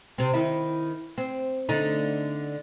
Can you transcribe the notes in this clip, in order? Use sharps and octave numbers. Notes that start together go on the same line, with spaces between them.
C3 C4
D#3 E4
C4
D3 A3 D#4